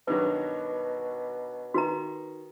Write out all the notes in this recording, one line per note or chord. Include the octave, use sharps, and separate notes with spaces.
G2 B2 D#3 F#3 B4
D#3 F#4 B4 A#5